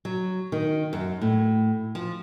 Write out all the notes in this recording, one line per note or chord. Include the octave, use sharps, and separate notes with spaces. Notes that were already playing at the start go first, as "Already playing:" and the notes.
F#3
D#3
F#2
A2
F3